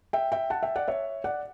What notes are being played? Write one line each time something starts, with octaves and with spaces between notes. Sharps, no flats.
E5 G5
E5 G5
F#5 A5
E5 G5
D5 F#5
C#5 E5
D5 F#5